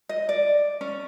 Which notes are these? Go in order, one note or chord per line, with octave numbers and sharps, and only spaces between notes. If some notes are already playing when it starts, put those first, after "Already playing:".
D#5
D5
C#4